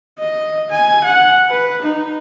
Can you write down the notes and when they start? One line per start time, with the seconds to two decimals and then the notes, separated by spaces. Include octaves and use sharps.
0.19 D#5
0.70 G#5
1.04 F#5
1.49 B4
1.82 D#4